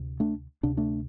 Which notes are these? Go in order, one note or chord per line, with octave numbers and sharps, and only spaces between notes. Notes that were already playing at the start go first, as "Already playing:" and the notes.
Already playing: D2 C3
A3 D4
D2 C3 D4
A3 D4